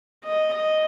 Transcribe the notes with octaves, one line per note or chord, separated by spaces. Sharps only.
D#5
D#5